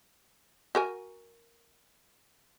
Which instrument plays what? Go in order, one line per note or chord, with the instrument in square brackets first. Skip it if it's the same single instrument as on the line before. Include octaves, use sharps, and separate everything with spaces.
[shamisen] F#4 A#4 G#5